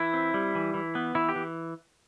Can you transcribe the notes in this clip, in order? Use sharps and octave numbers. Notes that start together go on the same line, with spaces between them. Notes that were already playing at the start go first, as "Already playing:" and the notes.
Already playing: E3 E4
C4
G3
E3
E3
B3
E3 E4
G4
E3